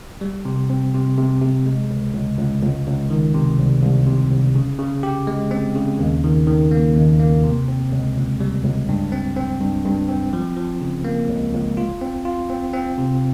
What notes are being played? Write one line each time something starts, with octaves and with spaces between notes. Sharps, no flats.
G3
C3
C4
C3
C3
C3
G#3
C#2
C#2
C#2
C#2
C#2
D#3
C3
C2
C2
C3
C2
C#3
C#3
G4
G#3
C4
C#3
D#2
D#3
D#3
A#3
D#2
A#3
C3
C4
C#2
C#2
G3
C#2
G2
C4
C4
G2
G2
C4
F3
F3
C#3
A#3
C#2
C#2
F4
C4
F4
C4
C4
C3